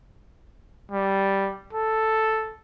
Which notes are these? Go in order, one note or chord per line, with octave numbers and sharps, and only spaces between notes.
G3
A4